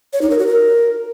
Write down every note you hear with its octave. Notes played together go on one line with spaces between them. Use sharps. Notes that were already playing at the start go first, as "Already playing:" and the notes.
C#5
D#4
A#4
F#4
A#4